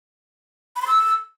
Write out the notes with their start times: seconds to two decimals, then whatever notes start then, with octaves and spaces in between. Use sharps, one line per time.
0.76 B5
0.81 C6
0.87 E6